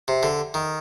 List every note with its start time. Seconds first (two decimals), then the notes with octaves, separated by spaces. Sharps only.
0.08 C3
0.23 D3
0.54 D#3